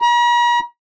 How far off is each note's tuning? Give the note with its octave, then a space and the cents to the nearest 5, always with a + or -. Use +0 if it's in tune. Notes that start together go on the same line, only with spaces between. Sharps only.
A#5 +45